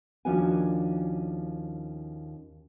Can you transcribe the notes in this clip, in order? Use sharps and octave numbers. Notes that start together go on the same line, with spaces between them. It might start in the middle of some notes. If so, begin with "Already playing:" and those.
D#2 F3 C#4 D4 F#4 G#5